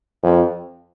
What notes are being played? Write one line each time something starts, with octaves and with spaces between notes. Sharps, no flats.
F2